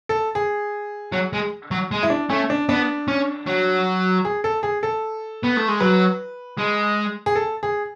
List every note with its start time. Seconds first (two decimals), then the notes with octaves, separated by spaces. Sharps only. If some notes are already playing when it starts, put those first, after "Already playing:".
0.09 A4
0.35 G#4
1.12 F#3
1.33 G#3
1.71 F#3
1.91 G#3
2.03 E4
2.10 D4
2.30 A3 C#4
2.50 D4
2.69 B3 D4
3.08 C#4
3.47 F#3
4.25 G#4
4.44 A4
4.63 G#4
4.83 A4
5.43 B3
5.56 A3
5.68 G#3
5.80 F#3 B4
6.58 G#3
7.26 G#4
7.36 A4
7.63 G#4